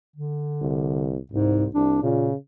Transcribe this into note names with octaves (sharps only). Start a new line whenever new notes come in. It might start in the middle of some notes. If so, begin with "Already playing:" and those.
D3
C2
C2 G#2
C2 D4
A#2 C#3